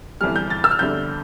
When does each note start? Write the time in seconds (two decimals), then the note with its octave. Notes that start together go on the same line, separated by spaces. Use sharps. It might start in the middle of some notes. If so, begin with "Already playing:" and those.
0.21 G1 F2 E3 G3 F6
0.36 G6
0.50 A6
0.64 E6
0.71 F6
0.79 G1 F2 D3 G3 G6